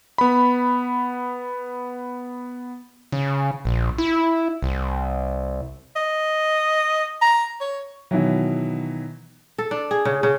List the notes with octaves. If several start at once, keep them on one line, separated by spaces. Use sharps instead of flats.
B3 B5
C#3
A#1
E4
C2
D#5
A#5
C#5
B2 D#3 E3 F#3
A4
D4
G#4
C#3
C#3